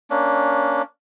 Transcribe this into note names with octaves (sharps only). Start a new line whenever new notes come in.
A#3 C#4 D4